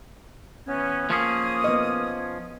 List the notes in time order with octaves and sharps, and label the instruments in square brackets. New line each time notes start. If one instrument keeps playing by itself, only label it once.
[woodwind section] E3 B3 C#4
[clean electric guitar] F3 C#4 G#4 [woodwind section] A#3 D#6
[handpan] B3 D#5